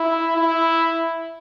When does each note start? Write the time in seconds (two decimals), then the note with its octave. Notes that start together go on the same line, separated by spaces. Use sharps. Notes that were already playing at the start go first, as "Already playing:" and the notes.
Already playing: E4
0.37 E4